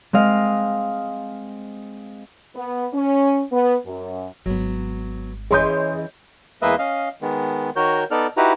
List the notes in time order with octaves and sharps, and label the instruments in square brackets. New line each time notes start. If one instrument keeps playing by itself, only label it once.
[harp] G#3 C4 D#5 F5
[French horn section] B3
C#4
B3
F#2
[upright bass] G#1 [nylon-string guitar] F#3 B3
[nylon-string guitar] E3 C#4 B4 [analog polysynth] G#4 D#5 [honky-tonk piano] C#5 C6 G6
[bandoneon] E2 G#3 A#3 B4 D#5 E5
C#4 D#5 F5
D#3 G#3 B3
D#3 F#4 A#4 C#5 G6
B3 D#4 A4 D5 F6
D#4 E4 F#4 G4 B4 A#5